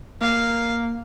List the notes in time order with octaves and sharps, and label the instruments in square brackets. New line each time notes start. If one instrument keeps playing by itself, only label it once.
[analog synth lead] A#3 [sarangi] F5